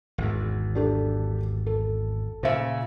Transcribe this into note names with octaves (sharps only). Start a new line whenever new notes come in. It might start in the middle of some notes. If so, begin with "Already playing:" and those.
G#1 E2
D4 G4 A4
A4
A#2 C#3 C5 E5 F5